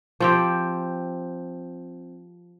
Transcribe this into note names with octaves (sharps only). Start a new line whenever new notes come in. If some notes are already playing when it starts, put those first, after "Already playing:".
F3 C4 G4